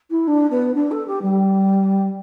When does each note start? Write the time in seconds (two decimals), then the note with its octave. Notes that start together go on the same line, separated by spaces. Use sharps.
0.10 E4
0.27 D4
0.50 B3
0.74 D4
0.91 A4
1.07 G4
1.21 G3